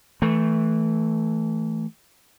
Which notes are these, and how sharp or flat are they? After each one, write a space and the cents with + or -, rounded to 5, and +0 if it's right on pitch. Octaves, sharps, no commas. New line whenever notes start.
E3 -15 A3 +0